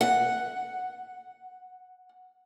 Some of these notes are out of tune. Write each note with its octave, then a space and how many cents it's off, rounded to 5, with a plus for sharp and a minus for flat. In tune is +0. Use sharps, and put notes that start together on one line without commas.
F#5 +0